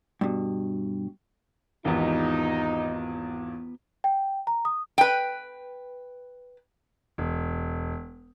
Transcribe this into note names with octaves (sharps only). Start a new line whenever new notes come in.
G2 B2
G#1 E2 B3 D#4 F4 G4
G5
A#5
D#6
B4 G5
E1